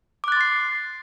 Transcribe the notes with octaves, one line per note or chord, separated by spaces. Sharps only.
C6 D6 F#6 A6 C7